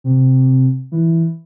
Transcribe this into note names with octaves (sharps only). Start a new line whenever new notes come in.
C3
E3